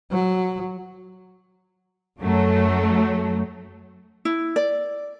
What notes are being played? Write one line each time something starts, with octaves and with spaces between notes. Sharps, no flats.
F#3
F#2 F#3 A3
E4
D5